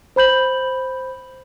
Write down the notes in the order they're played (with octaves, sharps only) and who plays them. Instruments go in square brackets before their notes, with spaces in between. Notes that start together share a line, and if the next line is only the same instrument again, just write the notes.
[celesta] C5 B5 G6 F#7